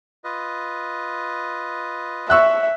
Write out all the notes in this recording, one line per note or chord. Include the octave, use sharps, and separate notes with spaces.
F4 B4 D#5
E5 C#6 E6 F#6